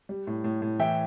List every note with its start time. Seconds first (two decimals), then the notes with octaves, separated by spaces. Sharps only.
0.09 G3
0.27 A2
0.44 A2
0.62 A2
0.79 E3 E5 G5